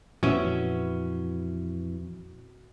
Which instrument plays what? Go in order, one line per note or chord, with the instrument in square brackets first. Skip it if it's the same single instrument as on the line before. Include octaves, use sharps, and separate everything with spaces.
[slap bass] F2 E3 [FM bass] A#2 [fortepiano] C#4 [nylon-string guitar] F#4 B4 E5